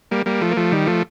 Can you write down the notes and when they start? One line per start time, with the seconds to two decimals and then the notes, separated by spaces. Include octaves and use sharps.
0.11 G3 A#3
0.26 G3 A#3
0.41 F3 A3
0.51 A#3
0.57 F3 A3
0.72 D#3 G3
0.87 F3 A3